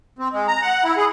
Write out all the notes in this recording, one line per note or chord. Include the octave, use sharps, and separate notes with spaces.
C4
G#3
A#5
F#5
E4
G#4